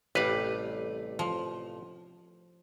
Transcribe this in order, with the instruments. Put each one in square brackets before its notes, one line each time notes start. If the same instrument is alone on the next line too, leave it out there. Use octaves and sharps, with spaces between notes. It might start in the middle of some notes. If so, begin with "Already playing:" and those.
[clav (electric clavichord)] A1 B4 [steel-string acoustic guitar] C3 A3 D5 [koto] G3 F5
[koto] F3